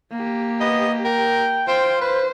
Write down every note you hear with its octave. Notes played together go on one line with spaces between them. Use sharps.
A#3 G4
B3 D#5
A#4 G5
F4 C5 G5
B4 C5